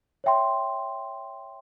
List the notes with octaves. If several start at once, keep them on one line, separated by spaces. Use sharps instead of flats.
C#5 E5 G5 C6